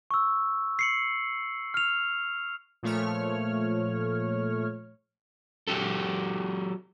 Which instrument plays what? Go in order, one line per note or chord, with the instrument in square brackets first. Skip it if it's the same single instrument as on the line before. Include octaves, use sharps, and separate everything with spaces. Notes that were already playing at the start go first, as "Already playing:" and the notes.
[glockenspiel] C#6 E6
C7 C#7 F#7
F6 F7
[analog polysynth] A#2 F3 A3 C#5 F6
[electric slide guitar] F#3 F#4 G4 A4